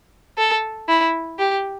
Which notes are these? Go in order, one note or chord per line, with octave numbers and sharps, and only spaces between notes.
A4
E4
G4